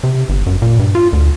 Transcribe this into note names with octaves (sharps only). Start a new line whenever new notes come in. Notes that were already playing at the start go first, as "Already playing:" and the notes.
C3
G1
F#2
A#2
G2
F4
D2